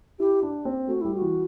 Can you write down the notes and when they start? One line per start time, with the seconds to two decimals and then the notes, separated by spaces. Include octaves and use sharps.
0.19 E4 G4
0.42 D4
0.65 C4
0.87 A3 F#4
1.01 G3 E4
1.15 F#4
1.21 E3